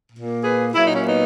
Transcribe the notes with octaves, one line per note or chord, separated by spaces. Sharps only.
A#2 A#3
G#4 B4
A#2 F#3 A#3 E4
D#4
C#4
B3 D#4